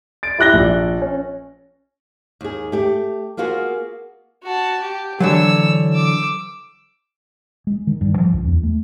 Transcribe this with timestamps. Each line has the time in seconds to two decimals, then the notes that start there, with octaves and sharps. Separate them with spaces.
0.23 A6 D7
0.39 E4 G4 F#6 A#6 G7
0.53 A#1
1.02 C#4
2.41 D#2 G#4
2.72 A3 G4
3.37 A#3 B3 F4 F#4 G#4
4.43 F#4 A5
4.81 G4
5.20 D3 E3 F#3 C#5 E6
5.93 D6 E6
7.67 G#3
7.87 D#3
8.01 G2
8.18 F3
8.33 C#2
8.48 E2
8.63 A3